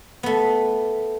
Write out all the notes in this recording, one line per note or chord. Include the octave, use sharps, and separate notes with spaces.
A3 B3